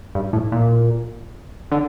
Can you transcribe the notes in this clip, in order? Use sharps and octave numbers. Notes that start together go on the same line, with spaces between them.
G2
A2
A#2
D3